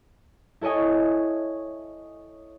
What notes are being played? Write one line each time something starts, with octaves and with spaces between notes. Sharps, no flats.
E4 A4 C#5 D#5 G#5